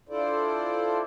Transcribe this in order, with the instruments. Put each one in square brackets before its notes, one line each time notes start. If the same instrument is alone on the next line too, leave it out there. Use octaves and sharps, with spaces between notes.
[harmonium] D4 E4 F4 A4 C5 D5